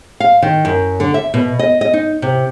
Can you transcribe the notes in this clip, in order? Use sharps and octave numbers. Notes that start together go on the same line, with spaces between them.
F5
D#3
F#2
D3
E5
B2
D#5
D#5
D#4
C3